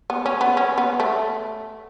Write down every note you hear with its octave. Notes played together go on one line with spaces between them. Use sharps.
B3
C#4
B3
C#4
B3
A3